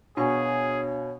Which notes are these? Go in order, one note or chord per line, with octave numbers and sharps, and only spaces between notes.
B2 D4 F#4 G#4 C#5 F5 G#5 C#6